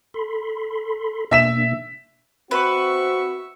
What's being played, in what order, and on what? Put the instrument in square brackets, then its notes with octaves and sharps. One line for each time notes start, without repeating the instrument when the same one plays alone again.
[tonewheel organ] A4 B5 C6
[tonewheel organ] B2 A#3 D4 [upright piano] E5 B6 E7
[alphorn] C4 [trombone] F#4 [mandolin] B4 [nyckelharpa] E5 C#6